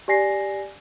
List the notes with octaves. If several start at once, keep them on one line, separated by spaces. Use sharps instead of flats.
G4 D5 G#5 A#6 C7